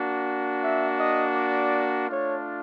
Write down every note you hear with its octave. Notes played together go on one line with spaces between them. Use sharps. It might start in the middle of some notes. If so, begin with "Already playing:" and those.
Already playing: A#3 D4 F#4
E5
D#5
D5
A3 D4 F4 C#5